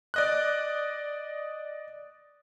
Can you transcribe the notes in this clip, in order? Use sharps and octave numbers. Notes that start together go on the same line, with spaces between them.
D5 D#5 F#6